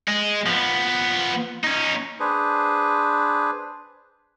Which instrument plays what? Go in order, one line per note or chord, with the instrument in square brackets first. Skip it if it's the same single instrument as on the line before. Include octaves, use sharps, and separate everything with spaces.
[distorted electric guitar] G#3
F3 B3
C#4 D#4
[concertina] D4 G#4 B4 C5